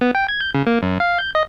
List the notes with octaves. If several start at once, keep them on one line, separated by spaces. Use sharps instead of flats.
B3
G5
G#6
G6
C#3
A#3
F#2
F5
G6
D#5